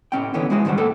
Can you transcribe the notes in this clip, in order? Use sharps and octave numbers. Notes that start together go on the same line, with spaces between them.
A2 C#4 G5
B1 D3 E3 B3 C#4
G#3 E4 F#4 G#4
G#2 D#3 G3 C5 F#5
A#3 A4 G5